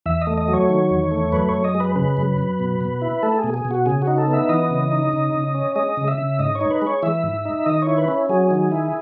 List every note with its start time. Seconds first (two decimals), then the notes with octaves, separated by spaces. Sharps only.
0.06 E2 E5
0.22 D#5
0.27 A3
0.38 D#5
0.48 F#3
0.53 C#5
0.69 D#3
0.90 E2
1.11 A3
1.32 F#2 B4
1.49 F#2 C#5
1.64 D#5
1.75 G#3
1.80 B4
1.96 C#3 B4
2.17 F#2
2.38 F#2
2.59 B2
2.81 B2
3.02 E4
3.23 A3 A4
3.38 G#4
3.44 B2
3.54 G#4
3.65 B2
3.71 F#4
3.86 C#3 G#4
4.02 F#4
4.07 D#4
4.18 A4
4.28 B3
4.33 E5
4.49 E3 D#5
4.70 C#3
4.92 D#4
5.13 C#3
5.34 C#3
5.55 C#4
5.76 G#3 D#5
5.97 C#3
6.08 E5
6.18 C#3
6.39 G#2 D#5
6.55 C#5
6.61 D#4
6.71 B4
6.82 G#3 C#5
7.02 E3 E5
7.24 G#2
7.45 D#4
7.66 D#3 D#5
7.82 E4 C#5
7.98 B4
8.08 C#4
8.29 F#3 G#4
8.51 D#3
8.72 E4